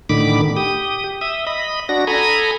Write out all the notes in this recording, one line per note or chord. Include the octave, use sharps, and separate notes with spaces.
A2 D3 D#3 B5 D6
G4 D#6
E5 D#6
D#5 B5
D4 F#4 A#6
A4 G#5 A#5 B5 D#6